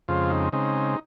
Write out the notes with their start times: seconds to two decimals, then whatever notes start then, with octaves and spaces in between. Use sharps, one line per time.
0.08 F2 C#3 G#3 C4 F4
0.30 D#4
0.53 C#3 G#3 C4 D#4